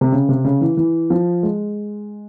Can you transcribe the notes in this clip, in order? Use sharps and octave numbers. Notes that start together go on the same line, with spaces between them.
C3
C#3
C3
C#3
E3
E3
F3
G#3